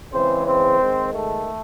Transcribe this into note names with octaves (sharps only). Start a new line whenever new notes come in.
C#3 E3 G#3 C4 C5
C4 C5
D#3 G#3
A3 A4